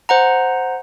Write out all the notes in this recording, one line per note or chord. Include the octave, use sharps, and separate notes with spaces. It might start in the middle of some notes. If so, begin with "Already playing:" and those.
C5 F#5 A#5